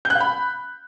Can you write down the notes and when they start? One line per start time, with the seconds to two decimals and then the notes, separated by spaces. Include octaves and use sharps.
0.05 G6
0.10 F#6
0.15 F5
0.20 B5